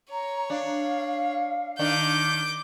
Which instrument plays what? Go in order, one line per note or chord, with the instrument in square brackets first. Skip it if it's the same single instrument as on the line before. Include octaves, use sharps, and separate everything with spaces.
[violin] C#5 [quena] A#5
[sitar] D4 [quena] F5
[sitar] D#3 D4 [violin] D6 G6